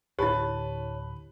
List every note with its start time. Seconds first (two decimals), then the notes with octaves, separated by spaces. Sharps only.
0.19 D2 A2 D3 E4 G4 B4 C#5 A5